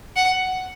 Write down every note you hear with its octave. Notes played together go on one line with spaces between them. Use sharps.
F#5